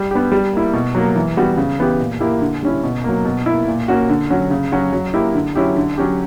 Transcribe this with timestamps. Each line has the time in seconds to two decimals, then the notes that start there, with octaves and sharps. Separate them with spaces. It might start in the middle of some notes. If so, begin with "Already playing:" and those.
Already playing: G3
0.11 B3 D4 G4
0.32 G3
0.53 A#3 E4
0.73 B2
0.95 F#3 A#3
1.16 E3
1.37 G3 B3 F#4
1.57 C#3
1.79 E3 B3 E4 G4
2.00 A#2
2.20 A#3 E4 G4
2.41 D3
2.62 G3 C#4 E4
2.83 B2
3.04 F#3 A#3
3.25 B2
3.46 A#3 E4
3.68 A#2
3.88 A#3 C#4 F#4
4.09 D3
4.30 F#3 C#4 F#4
4.51 C#3
4.72 F#3 C#4 F#4
4.93 F#3
5.14 A#3 E4 G4
5.35 D3
5.55 F#3 C#4 E4 G4
5.77 D3
5.98 F#3 C#4 G4